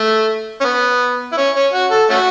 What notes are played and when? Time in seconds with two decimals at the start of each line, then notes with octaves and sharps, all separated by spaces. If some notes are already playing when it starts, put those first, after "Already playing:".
Already playing: A3
0.61 C#4
0.64 B3
1.32 E4
1.37 C#4
1.55 C#4
1.73 F#4
1.91 A4
2.10 A3 C#4 F#4